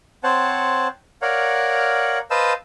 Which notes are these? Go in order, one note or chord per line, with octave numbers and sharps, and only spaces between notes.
C4 C5 C#5 F#5 A5
A#4 C#5 D5 F5 F#5
B4 C5 D#5 F5 A5 E6